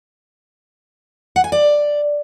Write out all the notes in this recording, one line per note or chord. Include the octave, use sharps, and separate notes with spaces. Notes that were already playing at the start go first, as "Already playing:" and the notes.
F#5
G#5
D5